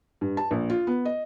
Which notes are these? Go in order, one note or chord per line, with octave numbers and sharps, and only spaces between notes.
G2
A5
A#1
F4
B3
D#5